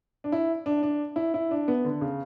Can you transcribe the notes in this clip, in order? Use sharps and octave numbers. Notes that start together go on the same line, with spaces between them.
D4
E4
D4
D4
E4
E4
D4
B3
D3
C#3